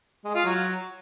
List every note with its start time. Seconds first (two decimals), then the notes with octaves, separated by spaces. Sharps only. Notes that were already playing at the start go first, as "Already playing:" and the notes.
0.25 G#3
0.35 F4
0.45 F#3